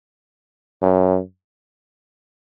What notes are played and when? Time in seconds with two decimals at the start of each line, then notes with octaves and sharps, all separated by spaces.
0.82 F#2